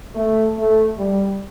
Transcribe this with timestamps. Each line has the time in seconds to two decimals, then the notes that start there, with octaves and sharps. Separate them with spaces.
0.15 A3
0.57 A3
0.98 G3